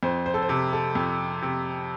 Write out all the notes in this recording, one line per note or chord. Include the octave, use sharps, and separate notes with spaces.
F2 C5
C5
A4
C5
C3
A4
F2
C3